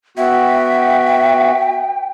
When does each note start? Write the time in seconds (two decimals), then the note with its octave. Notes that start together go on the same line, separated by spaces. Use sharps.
0.17 B3 F#4 E5 G5